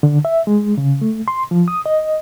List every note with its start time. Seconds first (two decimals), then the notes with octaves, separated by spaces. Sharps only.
0.03 D3
0.25 E5
0.47 G#3
0.78 C#3
1.02 A3
1.28 C6
1.51 F3
1.68 D#6
1.86 D#5